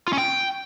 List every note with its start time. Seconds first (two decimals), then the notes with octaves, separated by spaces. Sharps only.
0.08 F4
0.13 C#4
0.18 G5